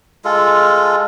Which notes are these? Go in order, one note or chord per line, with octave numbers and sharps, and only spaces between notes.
G#3 F4 A4